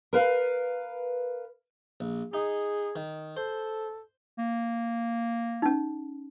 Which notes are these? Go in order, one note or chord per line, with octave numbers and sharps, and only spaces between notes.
A#4 B4 F5
A#1
D#4 G#4
D#3
A4 C5
A#3
C#4 D#4